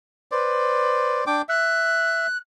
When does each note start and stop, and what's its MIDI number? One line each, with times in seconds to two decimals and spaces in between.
0.31 1.21 71
0.31 1.24 72
0.31 1.24 74
1.27 1.42 62
1.27 1.42 79
1.27 1.42 86
1.49 2.27 76
1.49 2.37 90